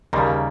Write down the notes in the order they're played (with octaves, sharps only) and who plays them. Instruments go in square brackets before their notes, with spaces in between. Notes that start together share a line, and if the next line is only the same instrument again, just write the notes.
[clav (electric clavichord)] D#2 C#3 G3 A#3 [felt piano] A#5